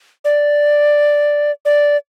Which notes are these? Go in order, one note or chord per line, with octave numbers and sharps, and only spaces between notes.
D5
D5